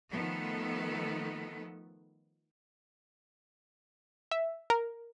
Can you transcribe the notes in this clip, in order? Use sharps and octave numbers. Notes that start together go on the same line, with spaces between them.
D#3 F3 A3 B3 A4
E5
A#4